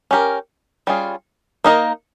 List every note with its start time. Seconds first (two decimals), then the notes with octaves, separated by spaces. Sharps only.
0.11 C#4 G4 A#4
0.87 G3 C#4 F4 G#4
1.64 A#3 D#4 A#4 D#5